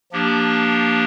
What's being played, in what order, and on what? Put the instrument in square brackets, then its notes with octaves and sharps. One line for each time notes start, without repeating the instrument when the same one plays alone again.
[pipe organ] F3 A#3 D4 G4